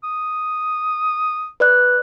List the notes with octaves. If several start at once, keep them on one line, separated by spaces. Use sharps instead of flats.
D#6
B4 D5 F#6